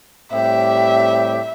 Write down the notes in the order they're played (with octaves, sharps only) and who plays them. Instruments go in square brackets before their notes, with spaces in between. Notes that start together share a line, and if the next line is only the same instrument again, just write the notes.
[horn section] A2 G3 C4 G4 [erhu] E5